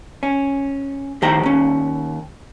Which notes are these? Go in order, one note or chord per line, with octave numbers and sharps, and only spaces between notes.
C#4
A2 D#3 G4 C5 G5 A#5
D#2 C#4